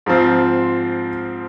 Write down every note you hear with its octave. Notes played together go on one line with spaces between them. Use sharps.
G#2 F3 C4 F4